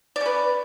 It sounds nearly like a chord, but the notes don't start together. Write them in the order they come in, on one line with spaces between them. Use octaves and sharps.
D5 C#4 B4